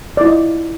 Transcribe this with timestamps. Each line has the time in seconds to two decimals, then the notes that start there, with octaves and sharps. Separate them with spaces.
0.17 D5
0.21 E4
0.24 F4
0.28 D#5